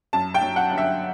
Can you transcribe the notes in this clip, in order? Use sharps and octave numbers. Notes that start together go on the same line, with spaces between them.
F#2 A5
G5
F#3
F#5
G1
E5